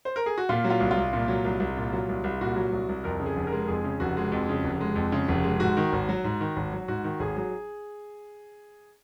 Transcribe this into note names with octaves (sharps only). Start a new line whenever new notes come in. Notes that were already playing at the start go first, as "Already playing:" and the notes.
C5
A#4
G#4
F#4
A#2 F4
F#3
F4
C2
F4
C2
A#2
F#3
C2
C2
A#2
F#3
C2
C2
A#2 F#4
F#3
C2
C2
F2 A#4
C#3
G#4
F1
A#4
G#3
F2 G#4
C#3
F1 F#4
G#3
F2
C#3
F1
G#3
F2
C#3
F1
G#3
G#2 F#4
D#3
G#1
F#3
G#2
D#3
G#1
F#3
G#2 F#4
D#3
G#1 G#4
F#3